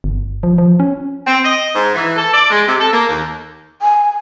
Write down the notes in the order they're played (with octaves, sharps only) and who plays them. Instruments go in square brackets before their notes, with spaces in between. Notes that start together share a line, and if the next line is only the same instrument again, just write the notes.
[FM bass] G1
F3
F3
C#4
[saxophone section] C4
D#5
G#2
E3
A4
D5
G#3
C3
A4
A#3
D#2
[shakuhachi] G#5